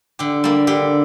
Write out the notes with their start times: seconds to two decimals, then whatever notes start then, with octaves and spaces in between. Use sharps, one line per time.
0.19 D3 G4
0.44 G3 A#3
0.67 D3 G4